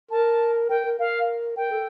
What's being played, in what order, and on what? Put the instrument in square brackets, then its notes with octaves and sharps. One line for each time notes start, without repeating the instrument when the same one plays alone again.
[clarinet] A#4 [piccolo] A5
[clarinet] A#4 [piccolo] G5
[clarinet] A#4
[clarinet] A#4 [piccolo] F5
[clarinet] A#4 [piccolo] G5
[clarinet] A4